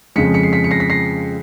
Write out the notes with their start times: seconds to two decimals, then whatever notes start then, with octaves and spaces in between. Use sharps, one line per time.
0.16 F2 C#3 F3 G#3 B6 C#7
0.34 B6 C#7
0.43 C7
0.53 B6 C#7
0.64 C#7
0.71 A#6 C7
0.80 B6
0.90 A#6 C7